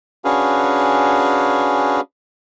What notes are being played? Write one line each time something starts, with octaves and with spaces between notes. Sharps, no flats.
C#4 D4 F#4 G#4 B4 F5